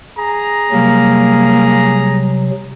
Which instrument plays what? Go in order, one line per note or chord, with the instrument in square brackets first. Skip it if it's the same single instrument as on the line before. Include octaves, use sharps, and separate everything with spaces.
[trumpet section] G#4 A#5
[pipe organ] C3 F#3 [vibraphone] G3 [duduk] A#3